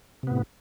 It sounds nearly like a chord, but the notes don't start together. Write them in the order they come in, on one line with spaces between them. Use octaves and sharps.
C3 B3 A2